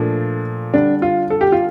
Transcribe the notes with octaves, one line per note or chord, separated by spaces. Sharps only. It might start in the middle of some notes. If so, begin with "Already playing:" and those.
Already playing: A#2 F3 A3 D4
D3 G3 D4
F4
A4
G4
F4